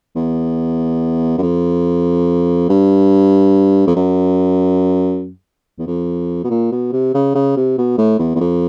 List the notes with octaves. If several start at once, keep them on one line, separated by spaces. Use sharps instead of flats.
E2
F#2
F2
G2
F2
F#2
E2
F2
B2
A#2
B2
C3
C#3
C#3
C3
B2
A2
E2
E2
F2